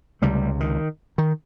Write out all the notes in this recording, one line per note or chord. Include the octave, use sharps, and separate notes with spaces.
C#2 C3 G3 A3
D#3
D#3